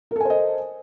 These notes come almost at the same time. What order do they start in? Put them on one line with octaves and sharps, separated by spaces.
A#4 A4 G#5 C5 D#5